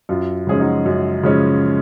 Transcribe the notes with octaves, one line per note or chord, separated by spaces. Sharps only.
F#2 F4
C#3 F3 G#3 C#4 G#4
D#4 F#4
F#2
C#3 F3 G#3 C#4